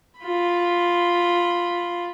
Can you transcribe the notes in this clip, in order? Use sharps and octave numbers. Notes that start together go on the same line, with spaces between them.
F4 B5